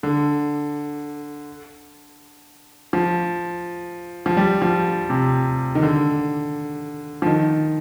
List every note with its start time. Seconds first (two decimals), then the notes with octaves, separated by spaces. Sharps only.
0.03 D3
2.93 F3
4.26 F3
4.37 G3
4.62 F3
5.10 C3
5.75 D#3
5.82 D3
7.22 F3
7.26 D#3